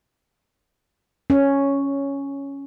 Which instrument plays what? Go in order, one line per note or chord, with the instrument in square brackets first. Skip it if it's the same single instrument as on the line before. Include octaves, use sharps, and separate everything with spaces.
[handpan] C#4